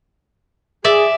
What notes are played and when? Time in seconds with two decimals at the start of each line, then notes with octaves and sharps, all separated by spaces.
0.84 G#4 D5 E5